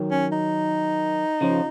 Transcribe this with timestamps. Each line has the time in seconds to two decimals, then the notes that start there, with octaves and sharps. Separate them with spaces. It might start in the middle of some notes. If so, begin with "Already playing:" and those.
Already playing: D#3 F#3
0.11 C#4
0.32 D#4
1.41 C#3 F3